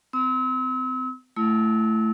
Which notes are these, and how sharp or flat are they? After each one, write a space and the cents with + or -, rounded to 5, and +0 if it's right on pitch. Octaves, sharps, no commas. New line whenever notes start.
C4 -30 E6 -40
A3 +0 E4 +25 E6 -35